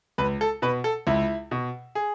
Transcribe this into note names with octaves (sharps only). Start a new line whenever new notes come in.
C#2 B4
A4
B2 B4
A4
C#2 E4
B2
G#4